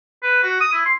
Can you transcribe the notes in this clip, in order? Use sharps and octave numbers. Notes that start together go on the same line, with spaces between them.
B4
F#4
D#6
E4
C6